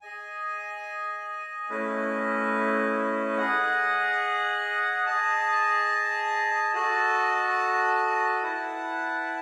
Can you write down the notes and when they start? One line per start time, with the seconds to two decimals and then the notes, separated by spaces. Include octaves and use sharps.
0.01 G#4 D#5 G#5
1.70 A3 C#4 E4 B4 D#5
3.38 G#4 D#5 F#5
5.06 G#4 D#5 A5
6.74 F#4 A4 D#5 A5
8.42 E4 B4 F#5 A5